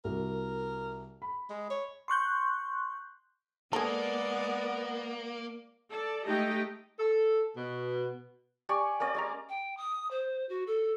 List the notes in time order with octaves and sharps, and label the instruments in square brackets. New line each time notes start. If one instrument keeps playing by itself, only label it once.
[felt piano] C2 F#4 [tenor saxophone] A#4
[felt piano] B5
[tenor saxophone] G#3
C#5
[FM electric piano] C6 C#6 F#6 G6
[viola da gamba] G#3 D5 [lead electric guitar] A#3 [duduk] B3 [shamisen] G#4 A4
[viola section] A4 D5
G#3 A3 D#4 G4 D#5 G5
[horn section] A4
B2
[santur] G4 D5 G#5 C#6
A#3 C#4 D5
G#3 G#5 A#5
[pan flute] G5
D#6
C5
F#4
A4